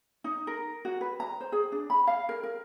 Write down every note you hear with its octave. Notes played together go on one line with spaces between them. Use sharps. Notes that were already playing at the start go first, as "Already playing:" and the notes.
D#4
A#4
F#4
B4
A#5
C5
G#4
D4
B5
F5
A#4
A#4